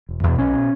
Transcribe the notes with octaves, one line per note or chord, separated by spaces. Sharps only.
E1
E2 B2
B1 C#4
B2